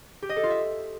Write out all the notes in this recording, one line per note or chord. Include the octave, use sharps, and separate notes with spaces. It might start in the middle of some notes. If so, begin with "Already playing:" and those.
G4
D#5
A4
F4
E5